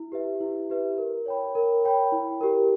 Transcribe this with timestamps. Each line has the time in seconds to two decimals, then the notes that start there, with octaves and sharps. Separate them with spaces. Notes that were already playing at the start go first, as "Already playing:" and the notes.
Already playing: E4
0.12 G4 B4 E5
0.40 E4
0.70 G4 B4 E5
0.98 A#4
1.26 C#5 G5 B5
1.55 A#4
1.84 C#5 G5 B5
2.12 E4
2.41 G4 A#4